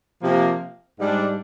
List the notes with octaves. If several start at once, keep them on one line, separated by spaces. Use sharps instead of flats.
C3 F3 A#3
G#2 G3 D4